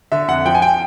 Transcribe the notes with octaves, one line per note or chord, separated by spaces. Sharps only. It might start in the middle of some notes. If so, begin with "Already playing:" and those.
D3 E5
F2 F#5
F3 G5
G#5
G5